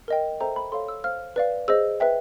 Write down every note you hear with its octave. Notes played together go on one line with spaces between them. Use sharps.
A#4 D#5 G5
A4 C5 E5 G5 A#5
B5
A4 C#5 F5 C6
E6
C5 F5 F6
B4 D5 F5
G#4 C5 D#5 E6
B4 E5 G5